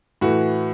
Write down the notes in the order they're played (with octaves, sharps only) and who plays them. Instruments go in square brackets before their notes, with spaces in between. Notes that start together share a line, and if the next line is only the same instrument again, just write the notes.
[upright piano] A2 E3 F#4